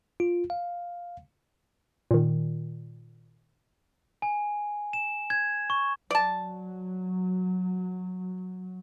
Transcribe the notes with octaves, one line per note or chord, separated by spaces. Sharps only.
F4
F5
A#2 D#3
G#5
E7
G#6
C#6
F#3 D5 A5